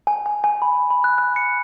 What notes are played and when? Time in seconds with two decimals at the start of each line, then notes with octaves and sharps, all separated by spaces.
0.07 G#5
0.26 G#5
0.44 G#5
0.62 B5
0.90 B5
1.04 F#6
1.18 F#6
1.36 C#7